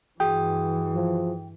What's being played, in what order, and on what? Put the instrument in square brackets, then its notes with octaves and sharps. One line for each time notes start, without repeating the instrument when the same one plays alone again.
[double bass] G2 E3 [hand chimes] F#4 G#4 D#6 [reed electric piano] G5
[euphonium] F3